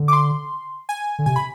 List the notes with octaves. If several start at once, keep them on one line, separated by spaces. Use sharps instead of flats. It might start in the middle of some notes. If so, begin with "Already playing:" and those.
Already playing: D3
D6
C6
G#5
D3
C3 G#5
B5